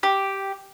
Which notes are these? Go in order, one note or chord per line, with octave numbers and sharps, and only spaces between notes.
G4